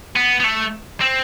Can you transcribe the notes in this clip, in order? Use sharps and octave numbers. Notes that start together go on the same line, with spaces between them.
B3
B3
A3
C4